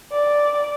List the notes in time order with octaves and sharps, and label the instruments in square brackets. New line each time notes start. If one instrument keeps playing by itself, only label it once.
[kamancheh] D5